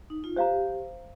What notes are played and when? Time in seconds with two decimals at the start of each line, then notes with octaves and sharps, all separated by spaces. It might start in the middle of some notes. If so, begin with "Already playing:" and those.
0.10 D#4
0.24 F4
0.36 G4 C5 F5 A#5